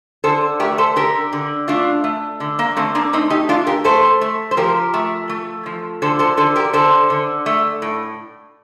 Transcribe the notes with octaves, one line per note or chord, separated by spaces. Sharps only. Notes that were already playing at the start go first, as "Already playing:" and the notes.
D3 A4 C5
A3 G4 A#4
A4 C5
D3 G4 A#4
D3
A3 D4 F4
A3
D3
A#3
D3 A3 C4
A#3 D4
A3 C4 D#4
D#4 G4
A3 D4 F4
G4 A#4
A3 A4 C5
A3
C5
F3 G4 A#4
A3
A3
F3
D3 A4 C5
A4 C5
D3 A4 C5
G4 A#4
D3 A4 C5
D3
A3
A2